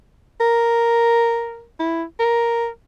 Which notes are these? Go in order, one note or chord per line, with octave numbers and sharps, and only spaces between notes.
A#4
E4
A#4